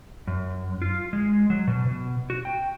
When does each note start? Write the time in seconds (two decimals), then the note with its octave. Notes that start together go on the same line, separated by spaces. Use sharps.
0.27 F#2
0.82 F4
1.13 G#3
1.50 F#3
1.67 B2
1.87 B2
2.30 F#4
2.45 G5